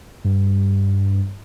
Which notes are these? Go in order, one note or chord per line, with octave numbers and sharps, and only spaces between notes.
G2